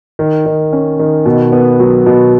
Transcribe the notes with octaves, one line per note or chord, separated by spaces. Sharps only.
D#3
D#3
C#4
D#3
B2
B3
F#3
B2